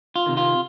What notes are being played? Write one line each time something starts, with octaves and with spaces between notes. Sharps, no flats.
F4
C3 D#3
F4